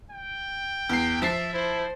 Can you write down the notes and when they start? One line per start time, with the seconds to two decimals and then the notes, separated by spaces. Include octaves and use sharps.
0.10 G5
0.89 E2 C7
1.22 F3 E5 A6 C7
1.53 E4 C5